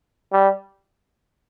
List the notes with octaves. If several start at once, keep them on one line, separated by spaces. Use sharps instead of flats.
G3